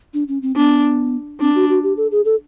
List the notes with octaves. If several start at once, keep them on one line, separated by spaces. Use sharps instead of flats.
D4
C#4
C4
B3 D4
C4 D4
F#4
F#4
G4
A4
G#4
A4